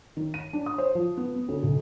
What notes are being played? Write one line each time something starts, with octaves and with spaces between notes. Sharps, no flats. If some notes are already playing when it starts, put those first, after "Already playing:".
D#3
D#7
D4
D#6
C5
F3
B3
B3
D2
B1